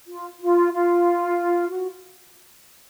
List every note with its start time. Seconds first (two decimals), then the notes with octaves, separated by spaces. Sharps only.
0.08 F4
0.41 F4
0.73 F4
1.70 F#4